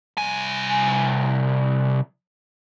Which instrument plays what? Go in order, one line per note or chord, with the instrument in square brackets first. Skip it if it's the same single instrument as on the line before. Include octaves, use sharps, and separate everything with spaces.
[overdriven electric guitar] C2 G#5